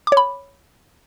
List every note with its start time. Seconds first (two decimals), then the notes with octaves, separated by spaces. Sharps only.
0.07 D6
0.12 C#5
0.17 B5